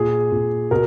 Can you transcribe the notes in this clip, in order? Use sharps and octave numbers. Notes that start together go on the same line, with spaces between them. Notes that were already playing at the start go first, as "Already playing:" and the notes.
Already playing: A#2 G#4
A#2
B2 A#4